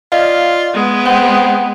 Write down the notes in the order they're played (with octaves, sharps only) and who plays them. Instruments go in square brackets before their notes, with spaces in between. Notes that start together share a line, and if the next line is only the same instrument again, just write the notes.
[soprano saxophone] F4 [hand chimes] D5 D#5 F5
[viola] G#3 B3
[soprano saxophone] C4 [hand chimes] F#5